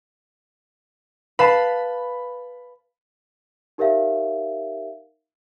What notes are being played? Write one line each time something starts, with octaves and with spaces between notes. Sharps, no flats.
B4 F5 A5 B5
D#4 G4 A#4 C#5 E5 F5